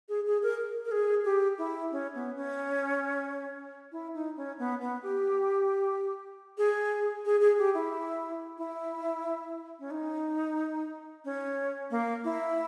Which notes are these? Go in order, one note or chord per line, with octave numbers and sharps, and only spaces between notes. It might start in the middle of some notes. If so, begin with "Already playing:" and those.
G#4
G#4
A#4
A#4
G#4
G4
E4
C#4
B3
C#4
E4
D#4
C#4
B3
B3
G4
G#4
G#4
G#4
G4
E4
E4
C#4
D#4
C#4
A#3
E4